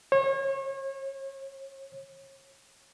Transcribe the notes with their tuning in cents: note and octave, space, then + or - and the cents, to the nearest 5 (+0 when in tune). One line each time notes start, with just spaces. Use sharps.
C#5 -35